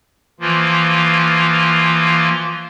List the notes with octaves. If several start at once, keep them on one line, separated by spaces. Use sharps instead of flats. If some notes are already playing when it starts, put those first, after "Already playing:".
E3 F3 A#3 F4